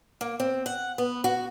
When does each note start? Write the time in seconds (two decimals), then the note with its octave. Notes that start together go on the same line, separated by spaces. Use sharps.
0.21 A#3
0.40 C4
0.66 F#5
0.98 B3
1.24 F#4